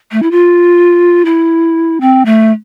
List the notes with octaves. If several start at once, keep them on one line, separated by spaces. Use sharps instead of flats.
A3
E4
F4
E4
C4
A3